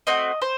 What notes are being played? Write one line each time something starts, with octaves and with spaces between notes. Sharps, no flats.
A3 C4 F#4 D#5
C5